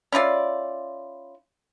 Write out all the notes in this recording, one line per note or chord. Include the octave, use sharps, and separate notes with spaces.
C#4 E4 F4 D5